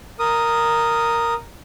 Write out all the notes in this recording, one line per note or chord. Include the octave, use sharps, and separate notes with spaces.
A#4 D#6